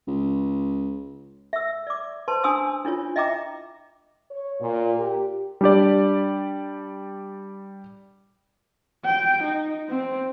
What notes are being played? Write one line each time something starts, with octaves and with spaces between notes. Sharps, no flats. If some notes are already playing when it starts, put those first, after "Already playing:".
C#2
E5 E6
D5 D6
B4 C5 A5 C6
D4 G#5 C6 D#6 E6
D4 E4 F4 C#5
D#5 E5 G5 A#5 D6
C#5
A#2
G4
G3 D4 G4 D5
G5
D#4
C4